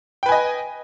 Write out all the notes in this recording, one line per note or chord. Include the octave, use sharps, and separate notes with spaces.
B4 D#5 G5 G#5